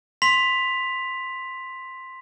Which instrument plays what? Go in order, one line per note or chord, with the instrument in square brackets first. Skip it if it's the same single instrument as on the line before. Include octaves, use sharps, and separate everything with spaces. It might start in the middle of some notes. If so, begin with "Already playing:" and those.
[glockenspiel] C6 B6 F7